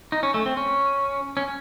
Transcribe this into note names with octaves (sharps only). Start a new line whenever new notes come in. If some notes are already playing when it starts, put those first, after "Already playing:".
D#4
C#4
A3
C4
C#4
C#4